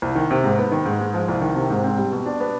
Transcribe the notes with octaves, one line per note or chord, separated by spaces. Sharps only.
C2
D#3
C3
G#2
B3
D#3
G#2
G#3
F3
C2
D#3
C3
G#2
C4
G3
B2
D4
B3